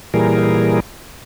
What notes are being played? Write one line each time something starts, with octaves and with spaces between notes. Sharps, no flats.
A#2 E3 G3 G#4 A#4